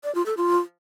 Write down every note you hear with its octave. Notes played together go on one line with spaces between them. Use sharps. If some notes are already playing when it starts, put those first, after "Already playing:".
D5
F4
A4
F4